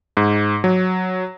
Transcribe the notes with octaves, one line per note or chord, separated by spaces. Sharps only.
G#2
F#3